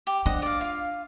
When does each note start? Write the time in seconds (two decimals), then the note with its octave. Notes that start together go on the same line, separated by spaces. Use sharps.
0.07 G4
0.26 D4 C5 D#5 F#5
0.42 D5 F5
0.61 F4 F5